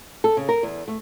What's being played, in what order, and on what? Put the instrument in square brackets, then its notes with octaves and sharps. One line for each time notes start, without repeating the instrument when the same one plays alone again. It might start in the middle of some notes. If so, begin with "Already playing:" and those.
[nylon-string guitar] A4
C#3
A#4
E2
A3